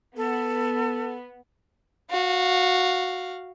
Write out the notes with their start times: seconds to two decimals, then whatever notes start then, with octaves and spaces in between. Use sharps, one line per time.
0.17 B3 A4
2.10 F#4 F5